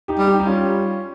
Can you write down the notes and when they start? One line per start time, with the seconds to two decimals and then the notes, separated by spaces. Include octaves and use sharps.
0.08 D#4 G4
0.19 G3
0.27 D#4 G4
0.40 D#4
0.46 G3 C#4 F4